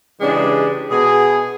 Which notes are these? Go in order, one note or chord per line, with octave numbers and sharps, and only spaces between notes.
C#3 E3 G#3 D4 G4
B2 G#4